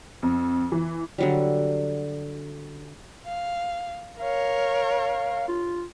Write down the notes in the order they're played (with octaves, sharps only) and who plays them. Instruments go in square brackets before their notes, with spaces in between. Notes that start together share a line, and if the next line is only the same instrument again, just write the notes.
[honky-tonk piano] F2
E3
[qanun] D3 F#3 G3
[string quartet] F5
[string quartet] A#4 C#5 [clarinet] F5
[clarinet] F4